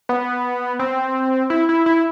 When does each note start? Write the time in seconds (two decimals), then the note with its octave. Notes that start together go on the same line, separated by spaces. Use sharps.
0.09 B3
0.79 C4
1.50 E4
1.69 E4
1.86 E4